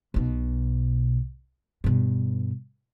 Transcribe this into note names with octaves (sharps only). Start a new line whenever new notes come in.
B1 B2
G2 B2